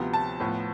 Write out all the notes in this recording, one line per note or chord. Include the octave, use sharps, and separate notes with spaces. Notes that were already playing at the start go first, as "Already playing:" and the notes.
Already playing: D2 C3 F3 B3
A5
A2 F3 B3